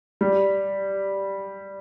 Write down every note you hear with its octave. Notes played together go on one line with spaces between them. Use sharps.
G3